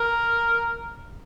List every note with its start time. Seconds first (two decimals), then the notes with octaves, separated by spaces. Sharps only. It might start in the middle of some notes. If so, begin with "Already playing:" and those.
Already playing: A#4